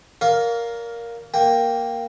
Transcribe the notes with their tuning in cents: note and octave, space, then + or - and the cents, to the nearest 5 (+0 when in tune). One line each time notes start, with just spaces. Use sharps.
A#4 +0 D5 -45 F5 +10
A#3 +0 G5 +0